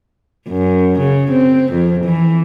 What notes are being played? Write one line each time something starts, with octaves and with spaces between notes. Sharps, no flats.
F#2
C#3
C4
F2
E3